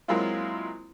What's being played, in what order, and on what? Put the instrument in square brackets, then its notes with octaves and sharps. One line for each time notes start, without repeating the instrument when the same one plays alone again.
[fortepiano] F#3 G#3 A#3 C4 E4 F4